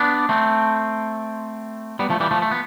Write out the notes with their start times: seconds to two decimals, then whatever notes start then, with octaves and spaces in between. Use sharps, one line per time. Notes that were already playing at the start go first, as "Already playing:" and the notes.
Already playing: B3 D4
0.29 A3 C4
1.99 G3 B3
2.10 F3 A3
2.20 E3 G3
2.31 F3 A3
2.42 A3
2.51 B3